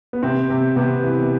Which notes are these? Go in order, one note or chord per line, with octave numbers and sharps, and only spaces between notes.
B3
C3 C4
C3
C3 B3
E3